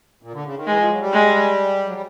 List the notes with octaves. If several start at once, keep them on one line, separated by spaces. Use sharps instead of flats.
A#2
D3
C#3
D#3
E3 G#3
F3
F#3
G3
G#3
F#3
G3